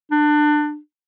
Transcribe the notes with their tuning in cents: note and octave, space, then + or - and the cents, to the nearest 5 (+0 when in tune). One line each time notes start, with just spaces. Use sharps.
D4 +25